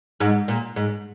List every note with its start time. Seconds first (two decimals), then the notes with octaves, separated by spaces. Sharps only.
0.20 G#2
0.48 A#2
0.76 G#2